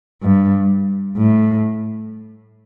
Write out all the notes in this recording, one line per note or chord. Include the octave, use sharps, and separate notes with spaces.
G2
A2